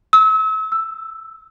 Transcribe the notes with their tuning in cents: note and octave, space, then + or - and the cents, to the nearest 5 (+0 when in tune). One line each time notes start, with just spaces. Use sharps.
E6 -35
E6 +5